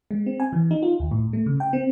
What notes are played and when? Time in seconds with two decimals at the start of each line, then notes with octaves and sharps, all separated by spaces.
0.11 G#3
0.26 C4
0.40 G#5
0.53 E3
0.71 D#4
0.83 F4
1.00 D#2
1.11 A2
1.33 A3
1.46 C#3
1.60 G5
1.73 C4